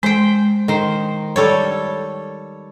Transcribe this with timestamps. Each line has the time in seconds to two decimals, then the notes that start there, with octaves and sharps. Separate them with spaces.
0.03 G#3 C5 G5
0.68 D#3 C5
1.36 G3 A4 C#5